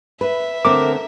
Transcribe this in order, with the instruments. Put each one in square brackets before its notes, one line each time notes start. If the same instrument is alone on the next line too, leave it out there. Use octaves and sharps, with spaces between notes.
[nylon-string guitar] B4 [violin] E5
[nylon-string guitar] D3 A3 C4 [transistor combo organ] A#4 [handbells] D6